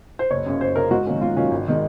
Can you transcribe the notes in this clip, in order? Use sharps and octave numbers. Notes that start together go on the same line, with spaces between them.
C5
F#1 C#5
F#2 C#3
F#1 C5
F#2 C#3 A#4
G#2 F#4
D#3 F#3 A#3 C#4
G#2 F4
D#3 F#3 A#3 C#4 F4
G#1
D#3 G#3